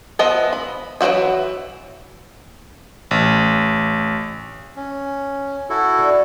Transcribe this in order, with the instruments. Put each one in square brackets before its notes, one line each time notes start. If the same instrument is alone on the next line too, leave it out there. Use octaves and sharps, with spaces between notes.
[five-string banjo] F3 B3 D#5 E5
B5
E3 F#3 C4 F#4 E5
[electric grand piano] A1
[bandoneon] C#4
E4 F#4 A4
[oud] D3